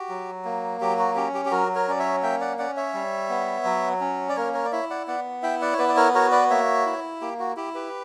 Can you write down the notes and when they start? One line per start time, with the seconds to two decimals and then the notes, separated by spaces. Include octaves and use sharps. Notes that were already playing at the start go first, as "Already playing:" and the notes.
Already playing: F#4 G4
0.09 F#3
0.45 A#3
0.81 F#3 G4
0.99 F#4
1.16 C#4 G4
1.34 G4
1.45 G4
1.51 F#3 F#4 A#4
1.75 A#4 C#5
1.88 C#4 D5
2.00 C#5 E5
2.23 A#3 E5 G5
2.40 D5 F#5
2.58 C#4 D5 F#5
2.77 C#5 E5
2.93 G3
3.29 B3
3.65 F#3
4.01 C#4
4.29 D5
4.36 A#3 A#4 C#5
4.54 A#4 C#5
4.65 D5
4.72 E4 C#5 E5
4.90 D5 F#5
5.08 B3 D5 F#5
5.43 E4 E5 G5
5.62 D5 F#5
5.73 C#5
5.78 B3 B4 D5
5.89 D5
5.96 A#4 C#5
6.15 F#4 A#4 C#5
6.32 B4 D5
6.50 A#3 C#5 E5
6.86 E4
7.21 A#3 G4
7.40 F#4
7.56 E4 G4
7.75 G4 B4